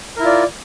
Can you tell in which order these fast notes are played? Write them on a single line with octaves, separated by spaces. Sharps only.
A#4 E4 F4 D5